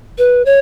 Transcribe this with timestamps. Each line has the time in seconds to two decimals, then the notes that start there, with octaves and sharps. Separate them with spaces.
0.18 B4
0.46 C#5